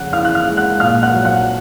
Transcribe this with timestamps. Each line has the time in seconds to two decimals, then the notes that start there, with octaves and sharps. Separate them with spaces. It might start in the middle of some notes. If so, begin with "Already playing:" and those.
Already playing: F2 C#3 F#5 F#6
0.13 E3 F5 F6
0.25 F#6
0.35 F5 F6
0.47 G#3
0.57 F#5 F#6
0.80 A#2 F5 F6
1.03 F#5 F#6
1.14 F#3
1.25 F#5 F#6